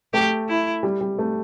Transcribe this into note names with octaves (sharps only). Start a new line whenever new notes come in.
A3 G4
E4
G3
G3
A3